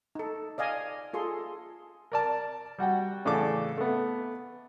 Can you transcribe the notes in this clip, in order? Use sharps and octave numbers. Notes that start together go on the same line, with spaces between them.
D#4 A4
D5 D#5 F5 G#5
F4 G#4 A4 C6
A#4 D5 A5
G3 F#4 F#5 G5
A2 C#3 E3 A4 D5 D6
A3 B3